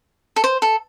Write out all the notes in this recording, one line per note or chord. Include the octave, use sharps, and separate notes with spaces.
A4
C5
A4